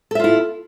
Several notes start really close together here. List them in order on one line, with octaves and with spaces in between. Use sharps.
A4 E5 F4 E4